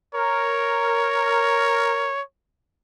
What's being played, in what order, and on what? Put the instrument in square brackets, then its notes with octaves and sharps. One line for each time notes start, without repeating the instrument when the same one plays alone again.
[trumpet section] A#4 [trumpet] C#5